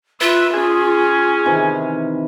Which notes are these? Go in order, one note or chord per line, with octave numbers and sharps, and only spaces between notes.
F4 B4 E5
C#4 G#4
C3 D#3 E3